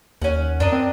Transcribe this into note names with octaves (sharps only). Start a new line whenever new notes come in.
D#2 C#4 F#5
F#2 D4 A#4 D#5
C4